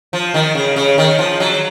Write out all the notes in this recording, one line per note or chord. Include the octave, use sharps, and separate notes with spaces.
F3
D#3
C#3
C#3
D#3
F3
F#3